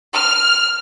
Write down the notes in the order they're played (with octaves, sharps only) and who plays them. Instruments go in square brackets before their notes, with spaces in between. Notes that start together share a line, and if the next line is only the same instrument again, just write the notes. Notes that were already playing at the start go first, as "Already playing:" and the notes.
[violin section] F6